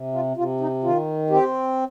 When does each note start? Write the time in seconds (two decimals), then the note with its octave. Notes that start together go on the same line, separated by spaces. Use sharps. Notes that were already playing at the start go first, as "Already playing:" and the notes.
Already playing: C3
0.14 F4
0.37 C3 F4
0.60 D#4
0.83 D#3 F4
1.30 C4 G4